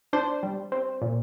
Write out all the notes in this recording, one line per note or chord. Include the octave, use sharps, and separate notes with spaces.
D4 C5
G3
C4
A#2